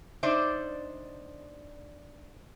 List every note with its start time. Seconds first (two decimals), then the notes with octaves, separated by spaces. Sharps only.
0.23 D4 D#4 C5 D5 E5